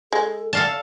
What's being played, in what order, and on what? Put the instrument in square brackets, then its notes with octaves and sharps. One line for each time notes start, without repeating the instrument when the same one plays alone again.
[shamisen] G#3 [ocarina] A4
[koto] A4 F5 A5 [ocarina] D5